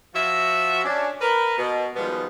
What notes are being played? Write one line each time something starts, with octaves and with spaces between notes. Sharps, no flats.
F3 F#4 E5
C#4 D4
A#4 B4
B2
B2 D#3 F3 G3 G#3 B3